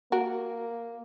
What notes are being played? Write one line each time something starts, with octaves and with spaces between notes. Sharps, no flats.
A#3 F#4 A#4